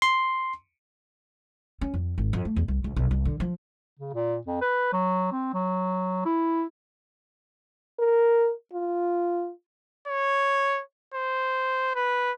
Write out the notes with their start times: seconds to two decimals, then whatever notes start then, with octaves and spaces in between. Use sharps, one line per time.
0.02 C6
1.81 C#4
1.94 F2
2.18 G#1
2.33 F2
2.45 A3
2.56 E2
2.68 C2
2.84 C#2
2.96 B1
3.11 C2
3.25 D3
3.40 F3
3.99 C#3
4.14 A#2
4.47 F2
4.61 B4
4.93 F#3
5.32 C4
5.54 F#3
6.25 E4
7.99 A#4
8.73 F4
10.08 C#5
11.14 C5
11.96 B4